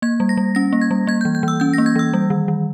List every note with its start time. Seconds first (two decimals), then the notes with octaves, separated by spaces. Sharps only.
0.02 A#3 G#6
0.20 G3
0.29 A#6
0.37 G3
0.55 C#4 A#6
0.73 A#3
0.81 G#6
0.91 G3
1.07 A#3 G#6
1.21 G6
1.25 E3
1.35 G6
1.43 E3 E6
1.60 C#4 G6
1.73 A#6
1.78 A#3
1.86 G#6
1.96 E3 E6
2.14 G3
2.30 D#3
2.48 D#3